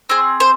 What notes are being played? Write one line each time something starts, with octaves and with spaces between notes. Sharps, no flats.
C4 G#4 C5
C5